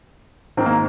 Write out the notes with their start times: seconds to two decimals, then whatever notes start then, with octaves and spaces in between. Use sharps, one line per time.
0.57 G#2 D#3 C4
0.66 A#3